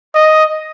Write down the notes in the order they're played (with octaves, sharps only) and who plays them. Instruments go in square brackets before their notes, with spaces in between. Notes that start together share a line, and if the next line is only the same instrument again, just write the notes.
[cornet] D#5